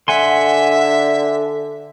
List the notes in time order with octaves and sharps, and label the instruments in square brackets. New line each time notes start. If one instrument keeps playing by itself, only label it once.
[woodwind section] D3 [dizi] E5 [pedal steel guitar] F#5 G#5 C6